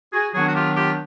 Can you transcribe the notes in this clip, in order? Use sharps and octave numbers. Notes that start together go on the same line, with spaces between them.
F#4 G#4
D#3 F#3 B3 D4 F#4 G#4
F#4
F4 G4
F4 G4